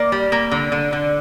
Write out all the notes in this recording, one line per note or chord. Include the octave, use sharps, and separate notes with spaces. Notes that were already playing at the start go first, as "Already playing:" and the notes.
Already playing: A#3 D5
G3
A#3
D3
D3
D3